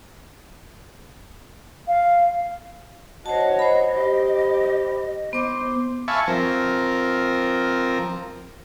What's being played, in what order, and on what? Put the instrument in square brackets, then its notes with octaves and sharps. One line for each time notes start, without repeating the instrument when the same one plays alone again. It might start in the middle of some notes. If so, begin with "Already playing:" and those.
[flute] F5
[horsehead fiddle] F#4 C#5 [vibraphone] C5 A5 [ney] D#5
[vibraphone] C5 B5
[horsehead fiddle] G4
[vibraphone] B3 D6 [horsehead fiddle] C5
[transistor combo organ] E5 F5 G#5 A5 B5 C#6
F3 C4 A#4